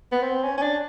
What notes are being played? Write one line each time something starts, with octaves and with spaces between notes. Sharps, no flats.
B3
C4
C#4
C#4
D4